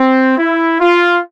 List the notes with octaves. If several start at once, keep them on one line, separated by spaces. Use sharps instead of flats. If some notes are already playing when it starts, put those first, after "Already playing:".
Already playing: C4
E4
F4